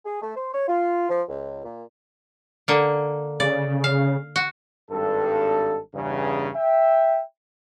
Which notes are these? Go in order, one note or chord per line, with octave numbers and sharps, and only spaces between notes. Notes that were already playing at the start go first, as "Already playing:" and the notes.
G#4
A3
C5
C#5
F4
F3
C#2
A#2
D3 A#3
C#3 D5
F5
F#4
G#1 G2 A4
E2 G2 C#3
E5 G5